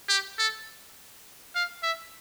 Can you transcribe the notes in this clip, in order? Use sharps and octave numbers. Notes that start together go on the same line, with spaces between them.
G4
A4
F5
E5